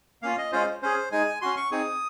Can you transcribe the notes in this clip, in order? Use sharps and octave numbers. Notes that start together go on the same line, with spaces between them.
A#3 C#4 F4 F5
D#5
G#3 C#4 F4 C5
C#4 G#4 C5
G#3 D#4 G#4 G#5
C#4 F#4 C6
C#6
C4 D#4 G#4 D#6